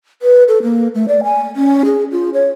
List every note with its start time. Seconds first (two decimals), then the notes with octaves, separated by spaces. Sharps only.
0.22 B4
0.48 A4
0.63 A#3
0.95 A3
1.08 D5
1.24 G#5
1.56 C#4
1.85 G#4
2.12 F4
2.34 C#5